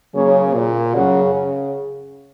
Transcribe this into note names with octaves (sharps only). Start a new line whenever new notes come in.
C#3 F#3 A#3 C#4 G#4 C#5
A#2
F#2 C#3 F#3 C#4 F#4
C#3